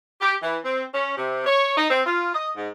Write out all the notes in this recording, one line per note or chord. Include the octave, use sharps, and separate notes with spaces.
G4
E3
C4
C#4
C3
C#5
D#4
C4
F4
D#5
G#2